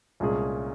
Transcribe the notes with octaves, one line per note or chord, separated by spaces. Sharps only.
C2 A#2 G#3 C#4 G#4